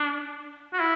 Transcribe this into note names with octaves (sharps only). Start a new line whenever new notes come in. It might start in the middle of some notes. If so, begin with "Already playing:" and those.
Already playing: D4
F#4
E4